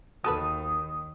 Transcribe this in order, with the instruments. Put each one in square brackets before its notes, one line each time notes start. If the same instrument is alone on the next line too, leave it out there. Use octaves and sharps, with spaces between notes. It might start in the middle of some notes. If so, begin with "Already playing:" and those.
[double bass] D#2 D#3 [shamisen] F#4 A4 B4 [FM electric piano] D#6